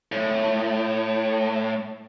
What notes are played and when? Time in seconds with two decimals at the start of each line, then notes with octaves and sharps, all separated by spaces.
0.12 A2